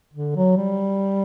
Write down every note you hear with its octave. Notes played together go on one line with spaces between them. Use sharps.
D3
F#3
G3